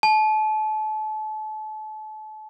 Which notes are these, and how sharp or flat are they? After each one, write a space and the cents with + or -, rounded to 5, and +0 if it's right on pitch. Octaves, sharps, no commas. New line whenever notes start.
A5 -35